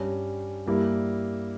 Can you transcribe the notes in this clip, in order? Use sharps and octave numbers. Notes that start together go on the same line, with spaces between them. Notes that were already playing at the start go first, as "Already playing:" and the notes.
Already playing: G2 G3 C#4
G2 G3 A#3 E4